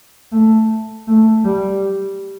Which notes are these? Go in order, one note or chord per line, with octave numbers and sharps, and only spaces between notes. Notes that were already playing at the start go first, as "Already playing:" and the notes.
A3
A3
G3